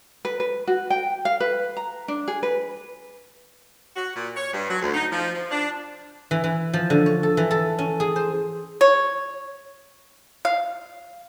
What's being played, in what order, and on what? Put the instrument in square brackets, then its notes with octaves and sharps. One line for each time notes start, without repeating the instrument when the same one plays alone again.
[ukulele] B4
B4
F#4
G5
F5
B4
A#5
D4
G#4
B4
[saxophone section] F#4
A#2
C#5
G2
F#3
D2
D#4
F3
F3
D4
[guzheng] E3
E3
F3
D3
C#5
A4
E3
A4
C#4
G#4
C5
[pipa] C#5
F5